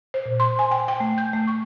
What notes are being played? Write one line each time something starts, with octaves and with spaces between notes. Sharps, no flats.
C5
A#2
C6
G#5
G5
G5
A3
G6
A3
C#6